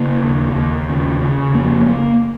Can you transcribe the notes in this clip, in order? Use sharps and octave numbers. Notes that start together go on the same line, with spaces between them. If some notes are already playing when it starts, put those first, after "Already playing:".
Already playing: C#3 A#3
D#2
D#2
C#3
C#3
F2 A#3
A#3